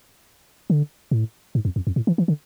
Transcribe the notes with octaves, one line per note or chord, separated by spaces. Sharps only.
D3
A2
G#2
F2
F2
F2
A2
E3
E3
D3